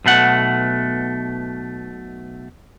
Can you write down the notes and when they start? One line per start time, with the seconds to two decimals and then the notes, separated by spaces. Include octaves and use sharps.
0.05 B1 B2 A3 F#5